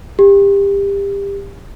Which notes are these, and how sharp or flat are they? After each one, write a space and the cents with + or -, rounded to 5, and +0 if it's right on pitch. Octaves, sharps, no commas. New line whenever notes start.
G4 +25